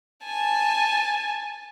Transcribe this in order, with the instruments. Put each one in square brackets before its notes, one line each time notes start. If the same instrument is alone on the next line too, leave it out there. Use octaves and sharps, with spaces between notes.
[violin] G#5 A5